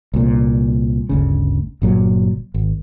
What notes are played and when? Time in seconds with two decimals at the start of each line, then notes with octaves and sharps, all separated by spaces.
0.14 C2 A#2
1.09 G1 D2 C#3
1.82 G1 A#2 F#3
2.54 G#1